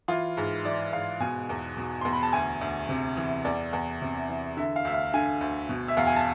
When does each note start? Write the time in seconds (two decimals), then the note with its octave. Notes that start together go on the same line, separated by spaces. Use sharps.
0.08 E3 F4
0.37 G#2
0.65 E3 D5
0.93 G#2 F5
1.20 B2 G#5
1.49 E2
1.77 B2
2.01 E2 C6
2.13 B5
2.23 A5
2.33 D2 G#5
2.61 D2
2.89 C3
3.17 E3
3.45 E2 D5
3.73 E2
4.02 C3
4.29 E3
4.57 D3 E5
4.76 F5
4.85 D2 E5
4.94 F5
5.14 D3 G#5
5.41 D2
5.69 B2
5.88 E5
5.97 E2 F5
6.07 G#5
6.16 A5